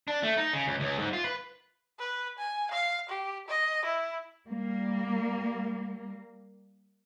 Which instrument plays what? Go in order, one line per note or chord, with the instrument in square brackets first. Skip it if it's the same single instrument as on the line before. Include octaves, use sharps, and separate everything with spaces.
[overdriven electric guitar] D4
A3
D#4
C#3
C#2
C#2
G#2
F4
B4
[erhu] B4
G#5
F5
G4
D#5
E4
[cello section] G3 A#3